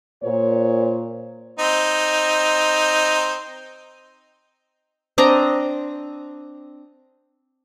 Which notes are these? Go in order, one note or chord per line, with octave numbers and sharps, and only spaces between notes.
A#2 C5 C#5
C4 D#4
C4 D4 D#5 A#5